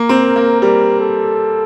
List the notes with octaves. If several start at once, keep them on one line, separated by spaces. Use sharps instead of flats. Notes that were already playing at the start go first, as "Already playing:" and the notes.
Already playing: A#3
C4
A#4
A#3
G3 A#4
A4